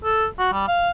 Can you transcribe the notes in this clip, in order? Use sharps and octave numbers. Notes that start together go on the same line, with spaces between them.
A4
F#4
G3
F5